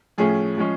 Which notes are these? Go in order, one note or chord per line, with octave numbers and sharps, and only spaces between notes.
A2 F3 A3 C#4 G#4
F3 G#3 C#4